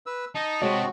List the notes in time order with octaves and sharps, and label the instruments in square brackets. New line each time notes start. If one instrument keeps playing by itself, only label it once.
[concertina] B4 E6
[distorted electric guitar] D#4 [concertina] D#5 A5
[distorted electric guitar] C3 [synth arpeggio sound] G#3 C#5 [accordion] C4 F#4